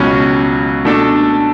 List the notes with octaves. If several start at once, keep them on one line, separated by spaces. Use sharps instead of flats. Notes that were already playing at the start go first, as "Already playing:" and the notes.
Already playing: C#2 B2 F#3 C#4
B2 A3 D4 A4